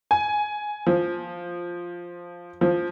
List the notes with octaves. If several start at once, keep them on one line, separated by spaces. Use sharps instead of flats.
G#5
F3
F3